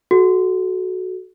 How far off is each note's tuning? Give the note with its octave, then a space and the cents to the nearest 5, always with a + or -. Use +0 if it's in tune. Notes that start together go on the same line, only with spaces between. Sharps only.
F#4 +0 A4 -35